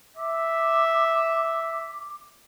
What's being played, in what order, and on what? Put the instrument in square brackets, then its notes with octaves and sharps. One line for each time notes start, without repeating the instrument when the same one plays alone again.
[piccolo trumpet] E5 [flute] D6